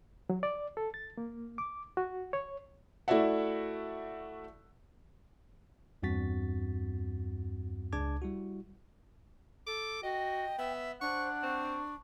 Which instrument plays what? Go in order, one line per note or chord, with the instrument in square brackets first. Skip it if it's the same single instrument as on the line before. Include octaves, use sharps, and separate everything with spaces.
[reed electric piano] F#3
D5
A4
A6
A#3
D6
F#4
C#5
[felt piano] A3 E4 F#4 D5 E5 F#5
[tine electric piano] E2 G2 C4 F#4 A6 B6
C#2 D4 G#4 A5 D6 G#6
G3 E4 F#4
[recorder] A4 [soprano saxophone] D6
[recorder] F#4 [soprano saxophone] D#5 [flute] G5
[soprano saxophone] B3 [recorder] E5
[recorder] D4 [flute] C5 [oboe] F#5 [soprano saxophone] C#6
[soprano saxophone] C4 [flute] C#6